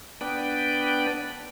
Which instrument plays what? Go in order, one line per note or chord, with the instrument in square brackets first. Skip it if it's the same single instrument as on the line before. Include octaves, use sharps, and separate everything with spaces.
[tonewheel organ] B3 D4 B4 D5 G5